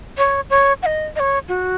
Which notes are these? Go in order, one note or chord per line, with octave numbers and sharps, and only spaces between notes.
C#5
C#5
F#5
D#5
D#5
C#5
F#4